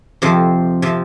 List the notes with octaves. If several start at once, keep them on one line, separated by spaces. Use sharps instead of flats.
F2 C3 F3 C5
C3 F3